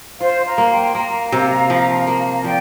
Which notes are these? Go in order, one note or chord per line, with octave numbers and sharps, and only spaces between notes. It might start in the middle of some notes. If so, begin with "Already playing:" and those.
F4 C5 F5
F5 A#5
A#3
G5 C6
A#3 F5 A#5
C3
F3
A#3
A#5
F3 D5 G5